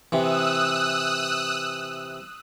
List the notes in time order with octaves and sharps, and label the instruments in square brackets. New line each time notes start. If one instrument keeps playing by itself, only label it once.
[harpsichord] C3 E3 [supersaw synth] D#6 E6 F#6